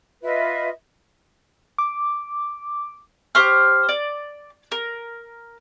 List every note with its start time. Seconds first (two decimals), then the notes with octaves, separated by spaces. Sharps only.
0.23 F4 B4 D#5 E5
1.78 D6
3.35 G4 C5 C#6 F6
3.89 D5
4.72 A#4